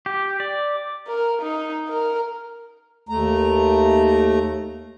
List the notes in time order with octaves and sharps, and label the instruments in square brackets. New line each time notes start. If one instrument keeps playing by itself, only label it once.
[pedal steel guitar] G4
D5
[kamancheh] A#4
D#4
A#4
[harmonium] D#2 A3 A#5